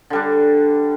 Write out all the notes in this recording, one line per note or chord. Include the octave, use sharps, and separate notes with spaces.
D3 G3 D4